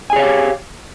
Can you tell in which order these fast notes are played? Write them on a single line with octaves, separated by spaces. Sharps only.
G#5 G#4 C#5 F5 G4